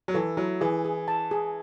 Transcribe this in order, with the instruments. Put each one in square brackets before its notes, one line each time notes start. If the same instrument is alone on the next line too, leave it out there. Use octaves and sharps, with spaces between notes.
[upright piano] F#3
[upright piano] E3 [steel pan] A4
[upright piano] F#3 [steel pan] E4
[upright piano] E3 [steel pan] G#4
[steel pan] G#4
A5
G#4